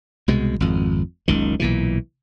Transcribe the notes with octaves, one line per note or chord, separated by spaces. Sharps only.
C2 B2 G#3
G#1 F2
F#1 C#2 D#3
B1 A#2 E3